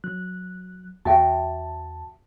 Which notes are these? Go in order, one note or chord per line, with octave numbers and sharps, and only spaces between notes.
F#3 F#6
E2 F#4 E5 G5 A5